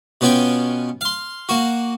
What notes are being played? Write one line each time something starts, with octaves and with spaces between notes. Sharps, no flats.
B2 B3 C#4 F4 G5 G#5
F5 C6
A#3 F#4